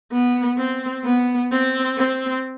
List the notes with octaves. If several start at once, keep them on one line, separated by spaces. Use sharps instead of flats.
B3
C4
B3
C4
C4